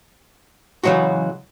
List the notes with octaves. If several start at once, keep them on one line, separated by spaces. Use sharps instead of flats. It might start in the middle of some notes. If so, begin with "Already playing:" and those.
C#3 E3 F#3 G#3 F#4